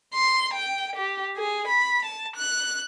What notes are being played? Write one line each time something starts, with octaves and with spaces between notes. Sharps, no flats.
C6
G5
G4
G#4
B5
A5
F#6